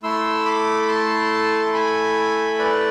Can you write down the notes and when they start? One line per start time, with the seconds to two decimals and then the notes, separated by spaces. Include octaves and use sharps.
0.03 A3 E4 A4 C6 E6
0.46 B5 D6
0.88 A5 C6
1.67 A5
1.73 G#5 B5
2.59 B4 D5